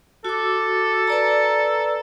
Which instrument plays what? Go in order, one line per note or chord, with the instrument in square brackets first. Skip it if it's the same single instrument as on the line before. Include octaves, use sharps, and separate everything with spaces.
[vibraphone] F#4 D6 [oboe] A4
[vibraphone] B4 D5 A#5